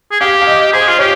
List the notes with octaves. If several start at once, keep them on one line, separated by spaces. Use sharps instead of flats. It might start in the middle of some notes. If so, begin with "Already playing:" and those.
G#4
G4 F5
F5
D#5
G#4 C5
F4
G4 C#5